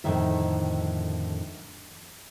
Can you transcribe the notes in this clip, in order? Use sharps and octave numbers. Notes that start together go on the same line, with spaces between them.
F2 A2 D3 D#3 E4 E5